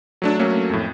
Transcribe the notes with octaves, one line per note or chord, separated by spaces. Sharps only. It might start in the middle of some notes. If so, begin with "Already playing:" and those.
F#3 A3 D4
F#3 A3 A#3 C#4
F2 A2